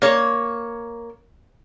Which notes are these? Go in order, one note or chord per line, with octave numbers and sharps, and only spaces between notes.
A#3 C#5